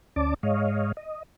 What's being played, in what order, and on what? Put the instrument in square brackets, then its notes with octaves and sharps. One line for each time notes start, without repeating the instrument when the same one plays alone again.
[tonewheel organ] D2 C#4 D5 A5 D6
G#2 G#3 C#5 D#5 F5
D#5